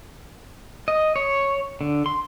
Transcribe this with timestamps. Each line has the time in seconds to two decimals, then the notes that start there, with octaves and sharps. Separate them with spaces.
0.88 D#5
1.16 C#5
1.81 D3
2.06 C6